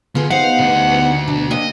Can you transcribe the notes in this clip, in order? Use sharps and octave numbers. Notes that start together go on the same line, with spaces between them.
D3 B3 F4 G#4
D#4 G4 C5 F5 F#5
D2 A3
B2 D4
A#3 C4 D4 D#5